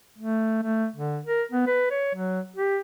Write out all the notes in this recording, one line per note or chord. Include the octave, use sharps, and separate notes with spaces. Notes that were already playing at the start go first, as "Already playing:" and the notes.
A3
A3
D3
A#4
B3
B4
C#5
F#3
G4